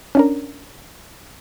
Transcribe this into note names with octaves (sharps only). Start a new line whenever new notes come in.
C#4 D4 A#4